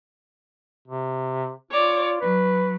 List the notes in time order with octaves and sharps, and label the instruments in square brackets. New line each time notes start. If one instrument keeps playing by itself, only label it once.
[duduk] C3
[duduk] F4 [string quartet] C#5 D5 D6
[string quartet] F#3 [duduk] B4